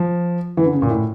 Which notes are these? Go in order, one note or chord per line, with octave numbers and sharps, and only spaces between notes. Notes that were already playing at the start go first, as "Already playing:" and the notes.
Already playing: F3
E3
D3
C#3
A#2
A2